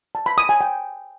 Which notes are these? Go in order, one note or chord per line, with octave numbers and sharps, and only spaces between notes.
A5
B5
D#6
G#5
G5